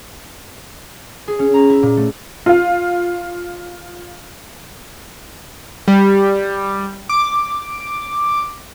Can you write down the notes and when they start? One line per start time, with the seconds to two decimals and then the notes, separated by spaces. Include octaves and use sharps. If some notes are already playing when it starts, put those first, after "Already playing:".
1.28 G#4
1.39 C#4
1.54 A#5
1.70 E4
1.82 A#2
1.97 A3
2.46 F4 F5
5.88 G3
7.09 D6